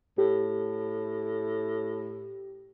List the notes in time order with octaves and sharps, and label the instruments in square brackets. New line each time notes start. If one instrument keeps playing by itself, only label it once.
[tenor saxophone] A2 [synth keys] G4